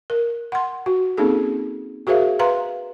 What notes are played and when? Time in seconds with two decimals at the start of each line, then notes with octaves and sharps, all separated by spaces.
0.10 A#4
0.52 F#5 C6
0.86 F#4
1.17 A#3 C4 C#4 D#4 G#4 A4
2.07 F#4 G#4 A#4 C5 E5 F5
2.39 B4 F5 A#5 C6